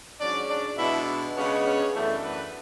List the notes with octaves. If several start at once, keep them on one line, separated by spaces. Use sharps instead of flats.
G#2 F#3 C#4 D4 D5
D4 D5
B2 G#3 D4 E4 E5
C#3 G#3 B3 C#4 D4 C#5
C#4 C#5
F#2 E3 A3 B3 D4 A4
B3 B4